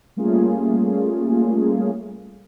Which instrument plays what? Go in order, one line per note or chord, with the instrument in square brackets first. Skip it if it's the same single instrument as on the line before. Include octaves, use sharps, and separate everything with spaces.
[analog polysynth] G3 A3 A#3 C#4 F4 G#4